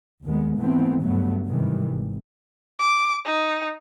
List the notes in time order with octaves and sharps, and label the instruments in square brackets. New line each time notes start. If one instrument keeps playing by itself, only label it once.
[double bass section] D#2 D#3 G#3 B3
G#1 E3 A3 B3 C4
G2 C#3 F#3 A3 B3
G#2 C3 D#3 E3 G3
G#1
[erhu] D6
D#4